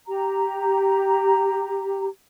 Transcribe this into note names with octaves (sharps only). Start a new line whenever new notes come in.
G4 A#5